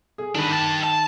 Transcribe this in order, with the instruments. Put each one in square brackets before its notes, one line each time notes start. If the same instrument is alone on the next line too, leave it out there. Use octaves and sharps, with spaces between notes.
[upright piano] G#4
[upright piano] D#3 [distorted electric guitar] D4 B4
[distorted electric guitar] G4 A5
A5